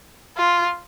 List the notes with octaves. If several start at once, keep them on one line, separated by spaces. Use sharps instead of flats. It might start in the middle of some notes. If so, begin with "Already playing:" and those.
F4